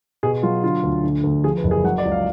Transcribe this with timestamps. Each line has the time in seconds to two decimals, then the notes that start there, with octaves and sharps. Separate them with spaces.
0.23 B2 G#4
0.43 F#3 F4
0.63 D3 F4
0.84 D2
1.03 D3
1.24 D2
1.44 F3 G#4
1.57 B4
1.64 F#1
1.71 G#4
1.84 F#3 F#5
1.98 D5
2.05 C#2
2.12 F5